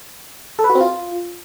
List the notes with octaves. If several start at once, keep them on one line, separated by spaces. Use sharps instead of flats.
A4
B4
F#4
C4
F4